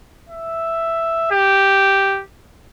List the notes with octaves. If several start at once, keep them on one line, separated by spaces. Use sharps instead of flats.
E5
G4